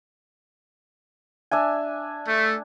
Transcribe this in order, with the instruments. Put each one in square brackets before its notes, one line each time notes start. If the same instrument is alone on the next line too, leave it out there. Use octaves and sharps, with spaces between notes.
[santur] D4 E5 G#5
[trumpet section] A3